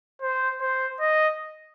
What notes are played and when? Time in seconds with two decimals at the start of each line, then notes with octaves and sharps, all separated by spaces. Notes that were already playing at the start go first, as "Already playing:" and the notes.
0.22 C5
0.61 C5
1.00 D#5